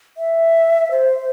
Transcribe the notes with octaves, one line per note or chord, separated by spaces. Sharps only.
E5
C5